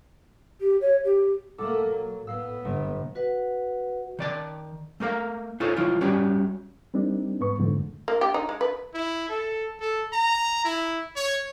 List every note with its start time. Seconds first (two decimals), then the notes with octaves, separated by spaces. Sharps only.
0.61 G4
0.81 C#5
1.04 G4
1.58 B2 A3 A#3 A4 F#5 D6
1.88 F#3
2.27 A2 B3 F5 E6 C7
2.65 G1 B2 F#3 A#3
3.15 F#4 B4 D#5 F#5
4.19 D#3 D5 A5
5.00 A3 A#3 A#4 F5
5.60 D#4 F4 G#4 A4 C5 C#5
5.77 D#3 F#3 E4 F4
6.01 G3 C#4 F#4 G4
6.94 G3 A#3 C4 D4 D#4
7.40 G#2 B3 B4 C#6
7.58 F2 G#2 D3 A3
8.08 A#3
8.21 G4
8.34 D#4
8.49 G#3
8.61 B4
8.94 E4
9.29 A4
9.80 A4
10.13 A#5
10.65 E4
11.16 C#5